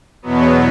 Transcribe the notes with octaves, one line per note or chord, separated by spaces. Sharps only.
E2 B2 F#3 B3